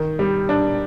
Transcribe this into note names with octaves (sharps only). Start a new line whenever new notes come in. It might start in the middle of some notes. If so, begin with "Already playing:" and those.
Already playing: D#3
G3
D4